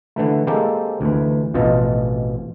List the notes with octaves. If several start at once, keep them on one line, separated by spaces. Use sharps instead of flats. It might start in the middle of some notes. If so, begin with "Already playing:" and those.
D3 E3 A3
G#3 A#3 C4 G4 A4
D2 E3
A1 F2 B2 F4 D#5 A5